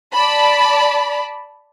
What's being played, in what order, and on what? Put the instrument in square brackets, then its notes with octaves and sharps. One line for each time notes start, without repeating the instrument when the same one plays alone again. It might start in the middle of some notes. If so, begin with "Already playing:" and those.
[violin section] D5 A5 B5